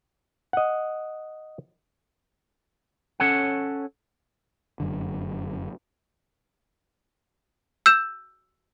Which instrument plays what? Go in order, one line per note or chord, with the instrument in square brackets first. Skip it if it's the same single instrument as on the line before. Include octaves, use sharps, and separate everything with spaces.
[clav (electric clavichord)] D#5 F#5
[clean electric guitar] C#4 A4 C#5 F#5
[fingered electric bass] F1 F#2 D3
[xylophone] E6 G6 E7